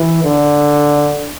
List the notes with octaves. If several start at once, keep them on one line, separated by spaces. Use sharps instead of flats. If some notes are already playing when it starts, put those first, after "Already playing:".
Already playing: E3
D3